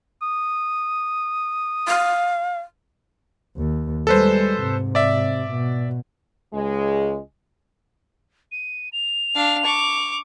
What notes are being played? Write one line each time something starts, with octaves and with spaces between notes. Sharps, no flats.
D#6
F5
D#2
G3 G#3 A4 B4 C5
G#2 C3
D5 E5
B2
C#2 G#3
D#7
F7
D4 F5
C#6 D6